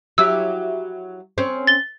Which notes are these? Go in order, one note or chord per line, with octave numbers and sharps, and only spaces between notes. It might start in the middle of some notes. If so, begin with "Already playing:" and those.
F#3 E4 G4 E6
C4 C#4
A6 G7